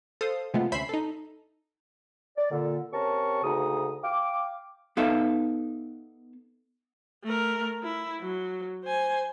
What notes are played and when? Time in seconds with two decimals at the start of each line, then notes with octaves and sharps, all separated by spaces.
0.21 A4 C5 F5 D#6
0.54 C3 G#3 A3 B3 F4
0.72 D2 C#4 C5 E5 B5 C7
0.89 D#4 A4
2.37 D5
2.51 A#2 D3
2.93 C3 C#4 A#4 A5 C#6
3.43 D2 G#2 C#3 D#4 D#6
4.03 F5 G5 D6
4.97 B3 D#4 A4 E5 F5
7.24 A3 A#4
7.83 E4
8.21 F#3
8.84 C5 G#5